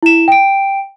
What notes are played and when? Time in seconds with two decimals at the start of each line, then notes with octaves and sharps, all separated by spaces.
0.03 E4 E7
0.28 G5 D7